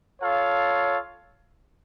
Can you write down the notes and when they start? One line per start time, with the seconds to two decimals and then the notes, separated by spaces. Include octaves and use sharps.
0.21 F4 A4 C#5 F5